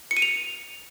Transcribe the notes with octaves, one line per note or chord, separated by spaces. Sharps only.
C#7
D#7
F7